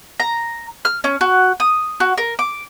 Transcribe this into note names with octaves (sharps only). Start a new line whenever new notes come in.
A#5
F6
C#4
F#4
D#6
F#4
A#4
D6